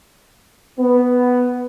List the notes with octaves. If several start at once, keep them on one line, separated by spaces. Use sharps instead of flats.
B3